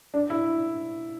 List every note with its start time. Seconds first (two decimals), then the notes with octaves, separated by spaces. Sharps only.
0.14 D4
0.30 E4